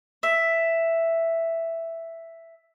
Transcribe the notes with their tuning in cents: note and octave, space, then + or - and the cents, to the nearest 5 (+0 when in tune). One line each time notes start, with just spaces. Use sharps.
E5 +5